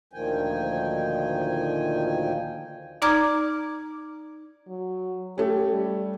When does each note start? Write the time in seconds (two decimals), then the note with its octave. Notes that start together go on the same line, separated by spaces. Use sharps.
0.13 D2 A#2 D#3 F3 G5 G#5
3.02 D#4 D5 A#5 D6 F6 G#6
4.68 F#3
5.38 A3 C#4 G4
5.73 G3